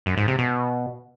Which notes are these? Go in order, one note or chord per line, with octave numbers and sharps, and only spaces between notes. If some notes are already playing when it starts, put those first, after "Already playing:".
F#2
G#2
C3
B2